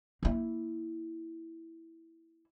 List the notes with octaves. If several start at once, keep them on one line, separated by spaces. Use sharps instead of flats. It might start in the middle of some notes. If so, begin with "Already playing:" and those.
A#3 E4